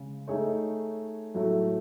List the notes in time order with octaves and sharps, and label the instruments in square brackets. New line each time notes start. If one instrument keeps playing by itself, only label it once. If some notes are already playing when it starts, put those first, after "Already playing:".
Already playing: [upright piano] C#3 G#3
A3 D#4 G#4 C#5
A2 F#3 A3